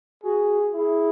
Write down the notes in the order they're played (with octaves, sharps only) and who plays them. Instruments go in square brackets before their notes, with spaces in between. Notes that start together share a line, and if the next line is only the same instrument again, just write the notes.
[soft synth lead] F#4 [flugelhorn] G#4
[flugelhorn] E4 [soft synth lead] G#4